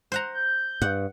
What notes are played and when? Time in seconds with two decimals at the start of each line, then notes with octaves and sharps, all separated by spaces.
0.12 C5 F#5 A#5
0.34 G6
0.82 G2 F#5